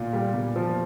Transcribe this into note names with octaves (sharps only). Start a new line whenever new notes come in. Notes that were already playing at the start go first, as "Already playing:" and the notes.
Already playing: A#2 F4
G3
A#2
F3